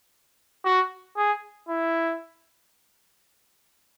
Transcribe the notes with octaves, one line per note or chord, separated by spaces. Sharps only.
F#4
G#4
E4